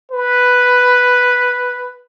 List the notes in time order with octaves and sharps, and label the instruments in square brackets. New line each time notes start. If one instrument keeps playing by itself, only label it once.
[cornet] B4